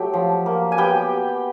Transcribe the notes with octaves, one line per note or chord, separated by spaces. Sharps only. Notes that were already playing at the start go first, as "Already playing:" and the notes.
Already playing: F#3 A3 G4
F3
A#3
G#5
B3 G4 G5